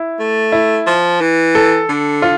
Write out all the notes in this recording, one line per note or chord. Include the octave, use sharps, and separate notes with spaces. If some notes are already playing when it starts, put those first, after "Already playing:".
Already playing: E4
A3
E4
F3
E3
A4
D3
F4